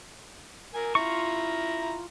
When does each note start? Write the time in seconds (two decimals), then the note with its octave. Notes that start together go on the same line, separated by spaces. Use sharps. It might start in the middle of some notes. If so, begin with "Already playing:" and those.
0.75 A#4 G#5
0.95 E4 F4 A#5 C#6